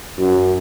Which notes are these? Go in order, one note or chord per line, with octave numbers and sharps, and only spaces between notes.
F#2